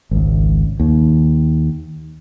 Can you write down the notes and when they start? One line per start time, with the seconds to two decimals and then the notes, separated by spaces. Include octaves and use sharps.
0.11 G#1 C#2
0.80 D#2